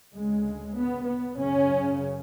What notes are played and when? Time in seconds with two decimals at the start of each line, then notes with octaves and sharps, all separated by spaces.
0.14 D2 C#3 G#3
0.76 B3
1.07 B3
1.39 F#2 C#3 C#4